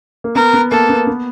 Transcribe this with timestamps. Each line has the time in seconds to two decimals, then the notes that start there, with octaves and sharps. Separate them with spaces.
0.24 A#3
0.35 B3 A#4
0.54 B3
0.71 A#3 A4
0.90 B3
1.07 B3